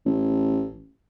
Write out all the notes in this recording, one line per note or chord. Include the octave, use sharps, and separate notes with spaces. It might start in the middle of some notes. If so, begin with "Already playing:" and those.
A1